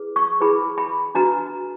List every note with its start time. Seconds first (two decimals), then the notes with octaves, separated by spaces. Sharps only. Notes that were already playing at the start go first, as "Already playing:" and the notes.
Already playing: E4 G#4 B4
0.16 C#6
0.41 E4 G#4 B4 B5
0.78 B5
1.15 D4 F#4 B4 A#5